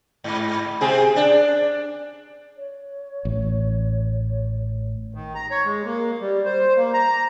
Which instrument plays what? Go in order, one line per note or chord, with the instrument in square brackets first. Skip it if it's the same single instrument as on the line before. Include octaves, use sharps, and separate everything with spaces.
[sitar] G#2
C3 C4 G#4
D4
[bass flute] C#5
[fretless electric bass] A1
[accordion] D#3
A#5
C#5
G#3
A#3
G3
C5
A#3
A#5